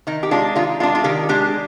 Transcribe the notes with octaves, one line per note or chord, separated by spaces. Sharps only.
D#3 D#4
G4
G#3 D4 F4
D#3 F4
G#3 D4 F4
F4
D#3 G4
G#3 D4 G4